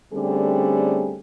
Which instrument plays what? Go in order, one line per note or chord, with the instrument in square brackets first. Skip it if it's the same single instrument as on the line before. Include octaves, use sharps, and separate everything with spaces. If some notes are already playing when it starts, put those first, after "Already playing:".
[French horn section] D3 G3 A3 C4 C#4 G#4